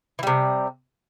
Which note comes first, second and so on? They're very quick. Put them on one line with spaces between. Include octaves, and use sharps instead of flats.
E3 G3 C3